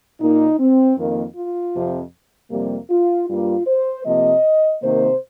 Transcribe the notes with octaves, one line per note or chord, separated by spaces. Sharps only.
A#2 A#3 D#4
C4
F2 D#3 A#3
F4
F2 C3 F3
F2 C3 G3 A#3
F4
G2 G3 A#3 F4
C5
C3 F3 A#3 D#5
C3 D#3 A#3 C5